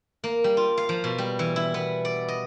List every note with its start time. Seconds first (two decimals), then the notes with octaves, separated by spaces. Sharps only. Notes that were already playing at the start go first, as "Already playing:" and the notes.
0.24 A#3
0.44 G3
0.57 F4
0.77 F5
0.89 F3
1.04 B2
1.18 G3
1.39 E3
1.56 E4
1.74 B3
2.05 D5
2.28 D#5